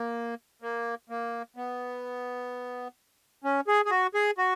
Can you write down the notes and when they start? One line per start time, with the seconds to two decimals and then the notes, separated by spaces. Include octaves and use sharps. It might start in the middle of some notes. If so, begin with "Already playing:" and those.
Already playing: A#3
0.62 A#3
1.10 A#3
1.56 B3
3.44 C#4
3.67 G#4
3.86 G#4
3.91 F#4
4.14 G#4
4.38 F#4